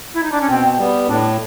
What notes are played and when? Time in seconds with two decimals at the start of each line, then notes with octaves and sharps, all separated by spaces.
0.14 E4
0.23 D#4
0.32 D4
0.41 C#4
0.49 B2 C4
0.79 G3 B3
1.07 A2 D4